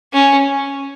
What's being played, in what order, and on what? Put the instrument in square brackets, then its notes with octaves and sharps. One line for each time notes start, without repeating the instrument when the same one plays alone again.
[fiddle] C#4